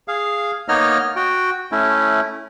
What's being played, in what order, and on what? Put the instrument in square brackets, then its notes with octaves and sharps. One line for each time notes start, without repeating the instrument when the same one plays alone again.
[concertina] G#4 F5
A#3 B3 D#4 C#5 D#5 F6
F#4 G5
A3 C#4 E4